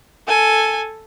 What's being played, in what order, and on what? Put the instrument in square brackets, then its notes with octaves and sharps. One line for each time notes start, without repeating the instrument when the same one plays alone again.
[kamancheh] A4 G#5